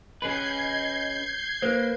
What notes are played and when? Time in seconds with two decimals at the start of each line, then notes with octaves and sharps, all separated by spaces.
0.22 C#4 G#4 B4 D#5 G6 G#6 C7
1.62 A#3 B4 C5